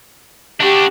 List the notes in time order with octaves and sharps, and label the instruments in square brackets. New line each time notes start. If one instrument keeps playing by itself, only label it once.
[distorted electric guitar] D4 F#4 [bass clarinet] G4